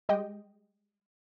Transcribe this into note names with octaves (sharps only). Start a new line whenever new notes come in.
G3 G#3 G4 D#5 G5